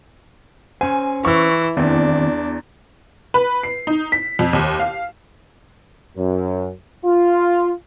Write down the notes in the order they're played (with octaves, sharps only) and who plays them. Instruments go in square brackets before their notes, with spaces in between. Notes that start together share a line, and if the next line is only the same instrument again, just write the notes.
[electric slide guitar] C#4 C5 [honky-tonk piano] G#5
[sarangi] E3 [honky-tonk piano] C#6 E6
[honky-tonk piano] E2 [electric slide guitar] D#3 C4 E4 [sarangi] D4
[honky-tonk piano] B4
C7
D#4
B6
F2
D#2
F5
[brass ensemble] F#2
F4